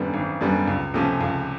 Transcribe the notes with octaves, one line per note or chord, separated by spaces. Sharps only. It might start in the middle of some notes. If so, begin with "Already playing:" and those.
Already playing: G#1 F#2 D3 G3 B3
G#1
F#2 D3 G3 B3
C#2
C3 F3 A3 C#4
C#2